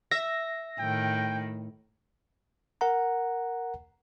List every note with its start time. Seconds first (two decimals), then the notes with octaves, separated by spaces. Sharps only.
0.11 E5 A#6
0.79 A2 D#3 G5
2.81 A#4 F#5 A#5